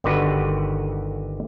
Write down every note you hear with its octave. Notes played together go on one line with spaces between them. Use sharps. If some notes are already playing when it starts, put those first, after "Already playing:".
G1 D3 D#3 F#4 G4 B4